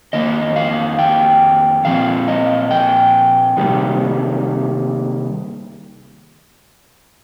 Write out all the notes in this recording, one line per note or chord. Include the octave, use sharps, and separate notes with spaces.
F2 D#3 A#3 D#5
F5
G5
A#2 F3 C4 F5
D#5
G5
C3 D#3 G3 A#3